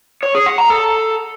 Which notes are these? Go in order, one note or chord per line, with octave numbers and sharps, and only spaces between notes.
C#5
G#4
F#5
A#5
A4